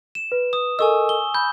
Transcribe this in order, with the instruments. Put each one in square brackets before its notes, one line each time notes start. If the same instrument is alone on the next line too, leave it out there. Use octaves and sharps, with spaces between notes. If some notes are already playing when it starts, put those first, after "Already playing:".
[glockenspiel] E7
[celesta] B4
[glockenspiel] D#6
[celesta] A4 A#4 D#5 [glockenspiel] G#5 C#6 E6
[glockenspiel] G7
[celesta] B5 [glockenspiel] G6